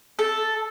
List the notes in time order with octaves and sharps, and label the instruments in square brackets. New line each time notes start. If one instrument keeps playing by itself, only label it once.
[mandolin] A4